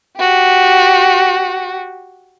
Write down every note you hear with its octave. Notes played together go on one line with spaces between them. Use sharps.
F#4 G4